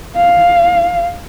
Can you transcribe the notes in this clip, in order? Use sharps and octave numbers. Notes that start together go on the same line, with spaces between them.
F5